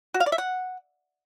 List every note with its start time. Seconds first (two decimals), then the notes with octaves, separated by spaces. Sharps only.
0.14 F#4
0.20 F5
0.26 D5
0.32 E5
0.38 F#5